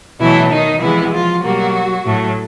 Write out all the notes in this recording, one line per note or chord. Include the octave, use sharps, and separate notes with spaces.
B2 E3 F#3 A3 E4
D#3 D#4
C3 E3 F3 G#3 B3 E4
F3 F4
B2 F#3 G3 A#3 F#4
A2 F#3 A3